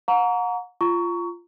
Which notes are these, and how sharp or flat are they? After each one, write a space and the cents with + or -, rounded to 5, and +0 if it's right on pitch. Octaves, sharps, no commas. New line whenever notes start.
F#5 -40 A#5 +0 C#6 +40
F4 -10 A#5 -10 C#6 +20